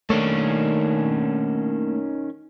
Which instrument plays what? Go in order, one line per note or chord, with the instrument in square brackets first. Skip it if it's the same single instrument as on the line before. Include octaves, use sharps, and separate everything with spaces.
[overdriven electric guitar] D#3 C#4 [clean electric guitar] A3 A#3 D4